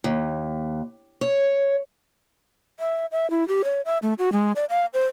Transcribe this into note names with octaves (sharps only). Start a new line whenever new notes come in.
D#2
C#5
E5
E5
E4
G4
C#5
E5
A3
F#4
G#3
D5
F5
C5